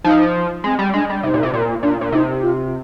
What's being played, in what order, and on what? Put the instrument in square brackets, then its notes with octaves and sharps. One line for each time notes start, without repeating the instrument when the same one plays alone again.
[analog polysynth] F3 [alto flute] D#4
[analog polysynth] G#3 [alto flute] C4
[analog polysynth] G3
[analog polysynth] G#3 [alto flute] D4
[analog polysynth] G3
[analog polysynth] C3 [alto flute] D#4
[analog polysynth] A#2
C3
A#2
[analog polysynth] A#2 [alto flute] D4
[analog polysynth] A#2
[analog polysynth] C3 [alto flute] D#4
[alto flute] F4